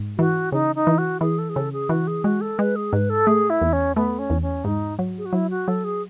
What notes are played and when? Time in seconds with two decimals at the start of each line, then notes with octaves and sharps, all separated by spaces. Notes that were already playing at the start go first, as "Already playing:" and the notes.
Already playing: G#2
0.18 E3 F#4
0.52 C#3 D#4
0.75 D#4
0.87 E3
0.98 F#4
1.21 E3 G#4
1.39 A4
1.49 G#4
1.55 C#3 A4
1.72 G#4
1.89 E3 F#4
2.07 G#4
2.24 G#3 F#4
2.41 A4
2.58 G#3 B4
2.76 G#4
2.93 G#2 B4
3.10 A4
3.27 A3 G#4
3.50 E4
3.61 E2
3.73 C#4
3.96 A3 B3
4.19 C#4
4.30 E2
4.42 C#4
4.64 G#2 D#4
4.99 F#3
5.18 G#4
5.26 F#4
5.33 F#3 E4
5.50 F#4
5.68 F#3 A4
5.84 G#4